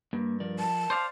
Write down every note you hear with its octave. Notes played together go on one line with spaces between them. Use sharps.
G2 A#3
F3 A#4 D5
A5
C5 D5 F5